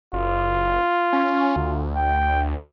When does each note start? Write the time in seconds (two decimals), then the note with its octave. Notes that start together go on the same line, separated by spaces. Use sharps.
0.13 F#1 F4
1.13 C#4
1.56 D2
1.96 G5